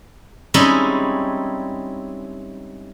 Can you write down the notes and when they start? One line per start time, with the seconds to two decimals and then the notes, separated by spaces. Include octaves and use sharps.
0.54 G3 G#3 C4 C#4 D#4 E4